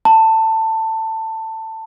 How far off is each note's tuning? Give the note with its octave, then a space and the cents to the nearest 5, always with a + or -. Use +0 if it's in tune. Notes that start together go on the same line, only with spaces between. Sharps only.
A5 +20